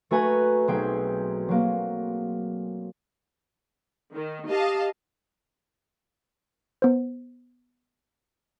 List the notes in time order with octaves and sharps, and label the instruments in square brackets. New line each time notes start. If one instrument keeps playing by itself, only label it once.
[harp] A3 F#4 B4 G#5 A#5
B1 C4 G#4 G5
F#3 A#3
[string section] D#3
[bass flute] G4 [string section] D#5 F5 A5
[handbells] B3 C5